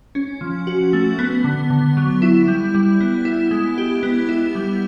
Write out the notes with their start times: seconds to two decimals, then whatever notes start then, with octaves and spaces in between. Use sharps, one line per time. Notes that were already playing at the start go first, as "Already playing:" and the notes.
0.15 C#4
0.41 F3
0.67 F#4
0.93 A3
1.19 B3
1.44 D3
1.70 D3
1.97 F#3
2.22 E4
2.48 G3
2.75 G3
3.00 B3
3.25 E4
3.51 G#3
3.78 G4
4.03 B3
4.29 E4
4.55 G3